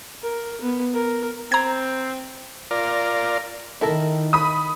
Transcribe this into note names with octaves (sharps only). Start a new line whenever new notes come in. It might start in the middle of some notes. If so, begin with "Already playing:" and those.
A#4
B3
A#4
C4 A#5 G#6
F4 A#4 D5
D#3 E4 A4 A#4
B5 D#6